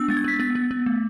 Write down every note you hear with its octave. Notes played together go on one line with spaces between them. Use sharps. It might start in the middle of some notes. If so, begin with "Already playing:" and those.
Already playing: B3 D4 E6
G#3 A6
G#6
B3 B6
B3 A6
B3
B3
A3